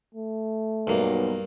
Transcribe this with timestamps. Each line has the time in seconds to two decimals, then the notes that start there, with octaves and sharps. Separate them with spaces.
0.14 A3
0.87 B1 G2 A#3